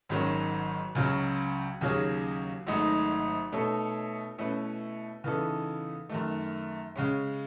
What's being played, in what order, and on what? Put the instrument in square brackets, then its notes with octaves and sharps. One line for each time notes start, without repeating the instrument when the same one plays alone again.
[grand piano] G#1 G#2 D#3 F#3 C#4
C#2 C#3 F#3 C#4
D#2 C#3 F#3 C#4 G#4
G#1 G#2 F#3 A3 D#4
B2 A3 D#4 A4 C#5
B2 A3 C#4 E4 B4
C#3 E3 B3 D#4 A4
F#2 D#3 A3
C#3 G#3 C#4